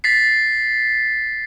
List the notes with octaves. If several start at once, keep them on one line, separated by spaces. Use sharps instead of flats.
A6 B6 C7